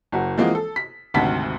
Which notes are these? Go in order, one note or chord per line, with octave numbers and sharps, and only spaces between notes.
F#1 F#3 F#4
E3 F3 G#3 A#3 C4 F#4
A4
B6
G#1 D2 C3 F#4 A5 B6